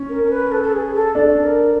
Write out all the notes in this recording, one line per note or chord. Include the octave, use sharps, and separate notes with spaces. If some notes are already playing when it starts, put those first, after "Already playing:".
Already playing: C#4
A#4
A#4
B4
A4
A4
G#4
A4
D4 A4
A#4